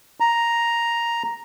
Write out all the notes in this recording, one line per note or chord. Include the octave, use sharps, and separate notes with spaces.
A#5